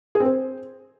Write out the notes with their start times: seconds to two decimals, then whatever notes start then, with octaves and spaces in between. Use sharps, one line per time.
0.15 G#4
0.20 C4
0.25 C5